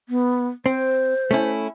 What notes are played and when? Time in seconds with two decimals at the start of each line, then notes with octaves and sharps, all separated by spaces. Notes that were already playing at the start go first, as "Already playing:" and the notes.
0.09 B3
0.66 C4 C5
1.31 A3 C#4 E4